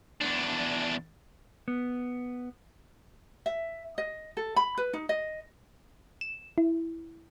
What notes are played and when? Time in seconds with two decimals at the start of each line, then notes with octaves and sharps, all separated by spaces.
0.21 E2 D4
1.68 B3
3.46 E5
3.98 D#5
4.37 A4
4.56 B5
4.78 B4
4.93 D#4
5.09 D#5
6.21 E7
6.58 E4